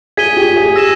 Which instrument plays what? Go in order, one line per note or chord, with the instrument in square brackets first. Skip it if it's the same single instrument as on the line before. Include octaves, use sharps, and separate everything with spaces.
[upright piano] G#4 [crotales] G#6 B6 D#7 G7
[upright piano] G4
G#4
[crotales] E6 A#6 E7